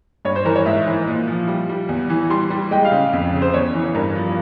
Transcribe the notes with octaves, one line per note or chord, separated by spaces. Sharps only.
G2 C#5
C5
E3 A#4
C#5
G#2 E5
E3
A#2
F3
G3
G3
E2
E3
G3 C6
G3
G#3 G5
F5
C#3
F2
C#3
C5
E2 C#5
E3
G2 A#4
F3